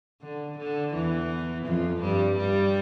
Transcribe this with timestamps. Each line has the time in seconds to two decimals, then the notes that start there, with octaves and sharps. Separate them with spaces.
0.22 D3
0.58 D3
0.93 E2 E3
1.66 F2 F3
2.01 G2 G3
2.36 G2 G3